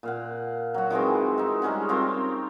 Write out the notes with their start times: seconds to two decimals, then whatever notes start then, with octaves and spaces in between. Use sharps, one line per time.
0.03 A#2 F5 F#5
0.74 F#3 F#4
0.90 D#3 E3 G#3 C4
1.38 D#4 E5
1.62 G3 G#3 C#4 F#5
1.89 C4 F4 A#4 C#5